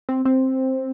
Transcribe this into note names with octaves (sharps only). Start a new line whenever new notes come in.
C4
C4